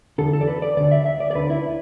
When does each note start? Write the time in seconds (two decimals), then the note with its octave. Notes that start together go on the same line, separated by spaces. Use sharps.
0.18 E2 D3 A4
0.33 A4
0.41 D5
0.47 B4
0.62 D5
0.77 D2 D3 D5
0.91 E5
1.06 E5
1.20 D5
1.31 D5
1.35 D2 D3 B4
1.50 E4